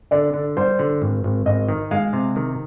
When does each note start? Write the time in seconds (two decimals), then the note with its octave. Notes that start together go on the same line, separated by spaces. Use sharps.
0.11 D3 D5
0.34 D3
0.57 G3 C5
0.79 D3
1.02 G#1
1.24 G#1
1.46 G#1 D#5
1.69 D#3
1.91 G#3 F5
2.13 C3
2.36 D#3